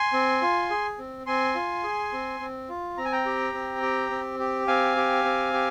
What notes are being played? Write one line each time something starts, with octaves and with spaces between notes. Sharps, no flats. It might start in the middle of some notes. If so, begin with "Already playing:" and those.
Already playing: G#5 C6
C4
F4
G#4
C4
C4 G#5 C6
F4
G#4
C4
C4
F4
C4 A#5
G#5
G5 A#5
G4
C4
G4
C4
G4
C4 F5 G#5
G4
C4
G4